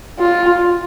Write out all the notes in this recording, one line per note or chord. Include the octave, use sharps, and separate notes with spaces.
F4